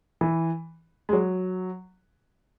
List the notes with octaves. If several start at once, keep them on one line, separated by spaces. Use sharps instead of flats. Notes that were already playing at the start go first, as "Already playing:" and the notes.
E3
G#3
F#3